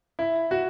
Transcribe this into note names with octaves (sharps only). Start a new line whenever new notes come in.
E4
F#4